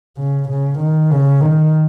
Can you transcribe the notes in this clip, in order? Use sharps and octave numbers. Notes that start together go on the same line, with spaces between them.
C#3
C#3
D#3
C#3
D#3